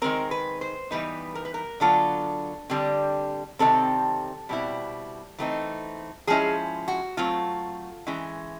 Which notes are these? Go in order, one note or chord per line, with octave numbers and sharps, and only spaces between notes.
D#3 G#3 C4 A#4
B4
C5
E3 G3 B3 D#4 B4
A#4
B4
A#4
D3 F#3 B3 D4 F4 A4
D3 G3 C4
C3 D#3 G3 C4 A4
B2 G3 C4 E4
E3 A3 C4 D#4
F3 G#3 C#4 E4 G#4
F#4
F#3 A3 C4 F4
E3 G#3 C#4 E4